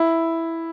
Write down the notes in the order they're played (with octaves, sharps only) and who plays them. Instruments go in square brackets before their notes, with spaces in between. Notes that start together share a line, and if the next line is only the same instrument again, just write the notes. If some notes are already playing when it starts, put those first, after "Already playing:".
Already playing: [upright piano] E4